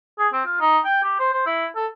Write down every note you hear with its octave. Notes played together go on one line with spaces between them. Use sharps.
G#4
C4
F4
D#4
G5
G4
C5
C5
E4
A4